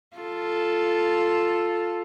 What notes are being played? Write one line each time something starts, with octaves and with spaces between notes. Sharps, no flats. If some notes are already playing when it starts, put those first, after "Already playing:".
F4 A4